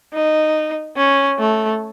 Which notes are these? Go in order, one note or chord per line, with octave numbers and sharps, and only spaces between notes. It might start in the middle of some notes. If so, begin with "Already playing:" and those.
D#4
C#4
A3